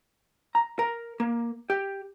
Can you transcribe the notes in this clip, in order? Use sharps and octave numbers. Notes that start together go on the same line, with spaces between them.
A#5
A#4
A#3
G4